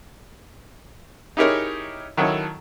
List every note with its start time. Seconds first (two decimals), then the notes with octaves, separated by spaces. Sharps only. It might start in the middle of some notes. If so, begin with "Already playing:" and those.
1.37 D#4 E4 G4 G#4 A#4 C#5
2.17 D#3 F#3 E4 A4 C#5